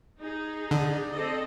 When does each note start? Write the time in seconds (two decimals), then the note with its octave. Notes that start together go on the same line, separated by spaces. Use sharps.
0.20 D#4 G#4
0.71 D3 D5
1.11 C4 A4 D#5